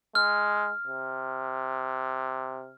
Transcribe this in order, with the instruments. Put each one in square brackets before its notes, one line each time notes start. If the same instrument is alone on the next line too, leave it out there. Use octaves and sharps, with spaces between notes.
[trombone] G#3 [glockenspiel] F6
[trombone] C3